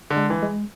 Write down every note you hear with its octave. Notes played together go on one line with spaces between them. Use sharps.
D3
G#3
E3
G#3